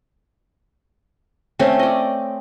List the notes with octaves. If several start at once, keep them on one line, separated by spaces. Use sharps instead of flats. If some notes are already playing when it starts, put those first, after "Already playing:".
A3 C4 C#4
D5 D#5